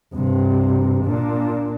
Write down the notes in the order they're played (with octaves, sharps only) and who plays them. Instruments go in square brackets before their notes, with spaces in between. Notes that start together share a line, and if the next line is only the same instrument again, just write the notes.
[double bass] G2 C3
A#2 D4